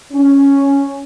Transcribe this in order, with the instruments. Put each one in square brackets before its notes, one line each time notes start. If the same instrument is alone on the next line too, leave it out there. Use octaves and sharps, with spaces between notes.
[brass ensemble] C#4